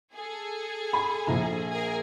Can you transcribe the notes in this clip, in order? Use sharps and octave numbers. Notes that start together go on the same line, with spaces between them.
G#4 A4
B5
A#1 F3 A#5
G#4 A#4